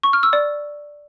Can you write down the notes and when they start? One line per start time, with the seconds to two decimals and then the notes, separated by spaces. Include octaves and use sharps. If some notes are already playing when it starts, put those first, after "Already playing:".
0.03 C#6
0.13 F6
0.23 E6
0.33 D5